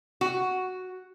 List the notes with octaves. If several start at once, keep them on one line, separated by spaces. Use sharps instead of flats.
F#4